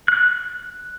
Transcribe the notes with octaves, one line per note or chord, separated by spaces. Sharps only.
F#6